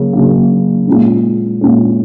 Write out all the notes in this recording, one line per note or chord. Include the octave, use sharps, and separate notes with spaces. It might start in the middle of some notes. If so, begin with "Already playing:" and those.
Already playing: C#3 F#3 A#3
C#3 F#3 A#3
A#2 G#3 C#4
A#2 G#3 C#4